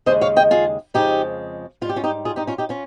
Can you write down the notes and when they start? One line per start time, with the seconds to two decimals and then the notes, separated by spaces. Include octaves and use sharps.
0.06 D#2 C#3 G#3 C5 D#5
0.21 C#5 F5
0.36 D#5 G5
0.51 F4 G#4
0.94 F2 C#3 F3 G#3 D#4 G4
1.81 G#2 G3 F4
1.89 G4
1.96 C#4 F4
2.04 D#4 G4
2.25 F4 G#4
2.36 D#4 G4
2.47 C#4 F4
2.58 D#4 G4
2.69 C#4 F4